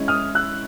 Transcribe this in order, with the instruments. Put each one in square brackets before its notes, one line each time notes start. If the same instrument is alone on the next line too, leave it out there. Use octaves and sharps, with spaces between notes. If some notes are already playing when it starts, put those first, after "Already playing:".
Already playing: [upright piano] G#3 C#4 E4
[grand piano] D#6 F6
E6 F#6